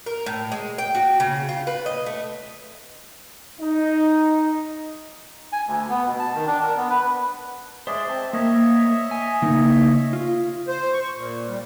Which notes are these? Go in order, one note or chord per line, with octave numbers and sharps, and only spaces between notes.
A#4
A2
G#3
G5
F#4
C#3
F4
B4
D#5
A3
D#4
G#5
D2
B3
B2
A5
D#3
D4
A#4
B3
B4
G#3 G#4 C5 D5 E5
C4 A5
A#3 C#5 D#5 E5
G#5
C#3 A#3 D#4
F4
C5
C#6
A#2
G3